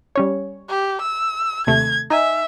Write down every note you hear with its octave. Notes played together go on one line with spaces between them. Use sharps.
G3 C#4 C#5
G4
E6
D#2 C3 A3 G#6
D#4 E5 G#5